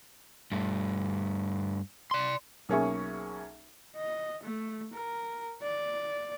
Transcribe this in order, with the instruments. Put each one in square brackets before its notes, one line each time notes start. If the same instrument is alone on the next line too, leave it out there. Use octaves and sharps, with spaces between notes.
[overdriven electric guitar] G2 A3
D5 C6
[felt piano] B1 A#3 C#4 G#4 E5 C#6
[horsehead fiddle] D#5
A3
A#4
D5